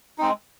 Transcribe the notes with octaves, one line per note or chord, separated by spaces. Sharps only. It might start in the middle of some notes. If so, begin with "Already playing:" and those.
G#3 C4 D#4